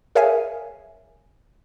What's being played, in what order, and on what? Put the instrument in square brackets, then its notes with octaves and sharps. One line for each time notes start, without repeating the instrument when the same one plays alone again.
[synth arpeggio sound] G#4 A#4 C#5 E5 F5 G#5